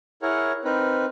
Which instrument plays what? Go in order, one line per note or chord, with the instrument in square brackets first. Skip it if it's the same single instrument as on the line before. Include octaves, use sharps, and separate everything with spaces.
[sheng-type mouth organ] E4 G#4 A#4 C#5 F#5
C4 D#4 A#4 B4